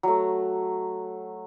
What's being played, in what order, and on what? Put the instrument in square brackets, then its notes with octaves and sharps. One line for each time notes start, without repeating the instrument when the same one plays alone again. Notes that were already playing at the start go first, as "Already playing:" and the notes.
[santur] F#3 A3